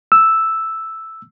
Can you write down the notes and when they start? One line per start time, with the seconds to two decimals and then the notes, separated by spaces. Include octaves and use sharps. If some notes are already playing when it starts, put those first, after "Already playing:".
0.12 E6